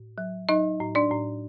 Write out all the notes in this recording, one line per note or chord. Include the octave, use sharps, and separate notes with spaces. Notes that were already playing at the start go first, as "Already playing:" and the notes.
Already playing: A2
F#3
F#3 D#4 D#5
A2
D4 D5
A2